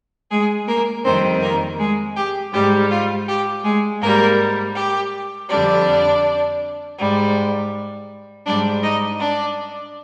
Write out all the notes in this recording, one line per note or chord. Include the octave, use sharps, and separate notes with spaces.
G#3 G#4
A#3 A#4
F2 D#3 G3 C4 C5
A#3 A#4
G#3 G#4
G4
G#2 G3 G4
F4
G4
G#3 G#4
G#2 G3 A#3 A#4
G4
F2 D3 G3 D4 D5
G#2 G3
G#2 G3 D4 D5
D#4 D#5
D4 D5